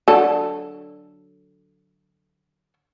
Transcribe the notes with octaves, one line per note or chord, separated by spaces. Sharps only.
D3 F#3 A4